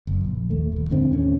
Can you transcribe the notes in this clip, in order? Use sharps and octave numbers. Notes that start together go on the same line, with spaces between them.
F#1
A#1
D#2 A3
D#1 B1
E2 G#2 D3 C4
D#2 A2 C#3 C#4